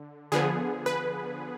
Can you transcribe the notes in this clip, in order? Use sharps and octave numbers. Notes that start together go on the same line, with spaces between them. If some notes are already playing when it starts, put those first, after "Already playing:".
Already playing: D3
D3 F3 B3 G#4
B4